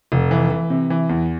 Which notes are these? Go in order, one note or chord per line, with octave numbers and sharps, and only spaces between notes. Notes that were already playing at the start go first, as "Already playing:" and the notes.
F1
E3
E3
C3
E3
E2